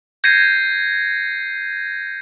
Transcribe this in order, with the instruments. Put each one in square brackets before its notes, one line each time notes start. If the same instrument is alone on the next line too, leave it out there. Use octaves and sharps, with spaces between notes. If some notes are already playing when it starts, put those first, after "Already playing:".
[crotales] G6 G#6 A#6 C7 C#7 D#7